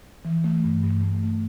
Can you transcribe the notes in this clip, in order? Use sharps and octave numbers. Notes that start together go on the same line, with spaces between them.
E3
A3
G2
G2
A3
A3